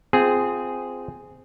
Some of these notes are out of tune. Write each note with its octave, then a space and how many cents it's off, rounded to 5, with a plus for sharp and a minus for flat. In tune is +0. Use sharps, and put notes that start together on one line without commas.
C4 -15 F4 +0 G#4 +0